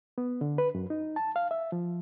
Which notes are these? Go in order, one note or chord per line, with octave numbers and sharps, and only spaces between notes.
B3
D3
B4
F#2
D#4
A5
F5
E5
F3